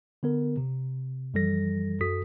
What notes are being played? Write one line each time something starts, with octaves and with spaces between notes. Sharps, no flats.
D3 B3 A#4
C3
F#2 E3 F3 G3 A4 A#6
F#2 F#4 A4 D#6 B6